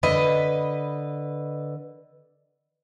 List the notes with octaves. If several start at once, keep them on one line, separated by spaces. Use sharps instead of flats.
D3 B4 D#5